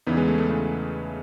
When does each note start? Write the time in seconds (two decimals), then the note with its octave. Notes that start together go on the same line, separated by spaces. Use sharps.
0.07 E2 C#3 E3 B3 D#4
0.17 G#3 B3
0.28 A3
0.38 A3
0.48 E2 C#3 E3 A3